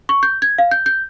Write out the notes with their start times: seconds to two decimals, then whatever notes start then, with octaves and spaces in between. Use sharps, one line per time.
0.09 C#6
0.23 G6
0.42 G#6
0.59 F5
0.71 G6
0.86 G6